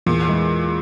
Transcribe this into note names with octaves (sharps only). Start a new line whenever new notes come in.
E2 A#2
E3 G#3